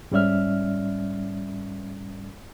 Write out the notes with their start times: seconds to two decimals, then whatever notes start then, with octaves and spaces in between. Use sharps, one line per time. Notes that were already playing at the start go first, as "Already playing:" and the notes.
0.11 G#2 G3 C#4 D5 E5 F6